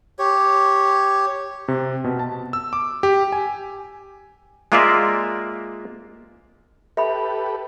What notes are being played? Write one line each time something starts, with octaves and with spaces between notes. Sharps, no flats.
G4 C#5
C3
B2
A5
E6
D6
G4
G#5
G#3 A#3 F4 A#4 D5 E5
G4 A4 B4 E5 B5